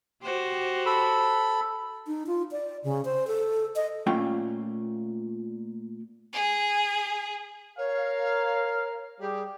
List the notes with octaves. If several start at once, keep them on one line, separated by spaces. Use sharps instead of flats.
F#4 G4 C5
A4 B5
D#4
F4
D5
C#3
C5
A4
D#5
A#2 A3 C#4 F4 G5
G#4
A#4 C#5 F5
G3 G4 G#4